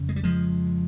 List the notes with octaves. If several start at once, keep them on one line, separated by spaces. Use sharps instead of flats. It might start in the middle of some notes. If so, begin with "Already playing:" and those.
Already playing: F2 C#3
G#3
G3
F3 G#3